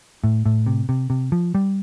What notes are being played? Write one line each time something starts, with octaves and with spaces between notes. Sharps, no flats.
A2
A2
C3
C3
C3
F3
G3